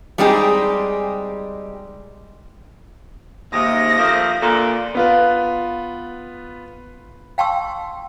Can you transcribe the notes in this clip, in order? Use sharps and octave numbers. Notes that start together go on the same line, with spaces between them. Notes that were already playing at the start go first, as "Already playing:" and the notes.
G3 G#3 C4 D#4 G4 G#4
D#2 G#2 C3 D#6 A#6
F3 A3 A#3
A#2 D3
B3 F4 B4
F5 G5 A5 C6 C#6 E6